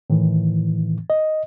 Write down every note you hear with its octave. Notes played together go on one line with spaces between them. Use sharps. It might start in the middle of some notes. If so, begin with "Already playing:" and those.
A2 D#3 E3
D#5